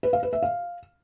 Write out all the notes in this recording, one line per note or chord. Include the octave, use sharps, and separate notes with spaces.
B4
F5
B4
E5
F5